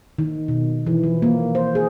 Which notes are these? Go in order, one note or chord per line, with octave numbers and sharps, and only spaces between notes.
D#3
B2
E3
F3
A#3
C5
G#4